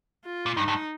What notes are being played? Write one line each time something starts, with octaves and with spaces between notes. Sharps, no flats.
F4
A#2
G2 D#4
G2